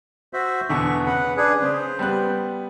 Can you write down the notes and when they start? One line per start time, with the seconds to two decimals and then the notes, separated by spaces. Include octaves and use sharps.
0.33 F#4 C5 E5
0.69 E2 B2 D3 E5 C#6
1.06 C#3 B4 F#5 B5
1.37 D4 G#4 B4
1.62 C#3 C5
1.99 G3 B3 F#6